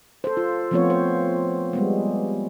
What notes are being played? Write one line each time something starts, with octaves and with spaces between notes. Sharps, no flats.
A4 C5
F4
F3 A3 B3 C4 F4 C#5
C5
G3 G#3 B3